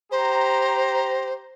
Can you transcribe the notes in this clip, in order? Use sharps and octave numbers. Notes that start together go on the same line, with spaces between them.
G4 C5 A#5